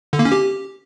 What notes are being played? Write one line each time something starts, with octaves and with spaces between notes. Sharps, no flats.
D3
A#3
C#4
G4